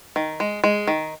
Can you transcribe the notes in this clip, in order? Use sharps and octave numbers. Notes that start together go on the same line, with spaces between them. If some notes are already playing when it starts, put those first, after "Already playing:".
D#3
G#3
G#3
D#3